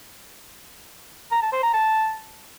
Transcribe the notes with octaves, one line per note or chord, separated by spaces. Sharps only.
A#5
A5
C5
A#5
A5